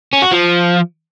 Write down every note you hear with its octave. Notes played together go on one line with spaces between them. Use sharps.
C#4
F#4
F3